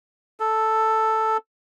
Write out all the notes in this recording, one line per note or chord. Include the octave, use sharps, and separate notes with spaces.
A4